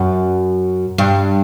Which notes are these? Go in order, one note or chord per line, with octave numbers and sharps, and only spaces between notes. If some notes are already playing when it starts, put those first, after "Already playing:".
Already playing: F#2
G2